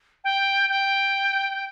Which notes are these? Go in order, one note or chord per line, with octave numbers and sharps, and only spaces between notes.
G5
G5